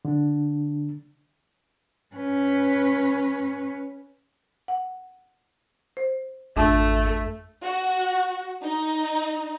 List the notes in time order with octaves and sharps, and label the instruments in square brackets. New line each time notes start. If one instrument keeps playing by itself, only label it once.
[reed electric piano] D3 D4
[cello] C#4 B4
[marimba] F#5
C5
[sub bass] G#1 [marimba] F2 D4 [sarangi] A3
[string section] F#4
D#4